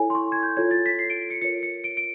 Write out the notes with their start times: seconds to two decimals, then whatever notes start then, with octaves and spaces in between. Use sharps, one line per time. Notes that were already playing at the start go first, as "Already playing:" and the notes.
Already playing: E4 A4 C#5 G#5
0.10 C6
0.15 C#6
0.32 G#6
0.43 G6
0.57 F4 A4 C#5 G#6
0.71 A6
0.86 B6
0.99 C7
1.10 D7
1.30 C#7
1.42 F4 A#4 C#5 C#7
1.63 C#7
1.84 D7
1.97 D7